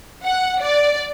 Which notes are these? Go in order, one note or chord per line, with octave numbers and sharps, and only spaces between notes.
F#5
D5